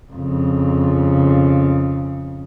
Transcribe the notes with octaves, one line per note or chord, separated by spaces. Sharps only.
F2 C#3